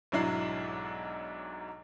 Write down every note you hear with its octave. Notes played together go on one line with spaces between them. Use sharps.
B1 G#2 F#3 D4 E4 C7